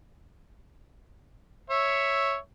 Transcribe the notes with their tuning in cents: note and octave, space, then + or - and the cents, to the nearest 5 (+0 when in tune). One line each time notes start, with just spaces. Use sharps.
C#5 +0 E5 +0